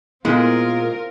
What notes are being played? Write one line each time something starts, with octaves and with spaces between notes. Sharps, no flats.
A#2 G#3 B3 C4 E4 F4 A#4